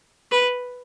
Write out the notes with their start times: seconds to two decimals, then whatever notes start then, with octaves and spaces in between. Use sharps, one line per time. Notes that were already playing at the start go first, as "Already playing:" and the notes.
0.31 B4